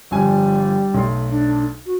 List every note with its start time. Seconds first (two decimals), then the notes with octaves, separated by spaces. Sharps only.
0.11 G1 F3 G3 G#5
0.94 B1 A3 C6
1.30 D4
1.86 F#4